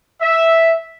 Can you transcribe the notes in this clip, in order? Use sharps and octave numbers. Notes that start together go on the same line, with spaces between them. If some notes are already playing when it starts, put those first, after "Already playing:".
E5